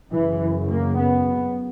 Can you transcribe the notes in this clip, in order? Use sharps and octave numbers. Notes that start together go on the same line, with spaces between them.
F#2 C#3 E3
A#3
B3